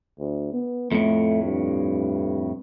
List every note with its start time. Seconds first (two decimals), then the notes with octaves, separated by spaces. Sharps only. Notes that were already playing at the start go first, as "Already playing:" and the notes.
0.19 D2
0.53 B3
0.92 F2 A2 A3
1.44 G2